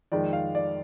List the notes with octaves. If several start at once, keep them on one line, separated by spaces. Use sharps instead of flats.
F2 D#3 G#3 D5
F5
D5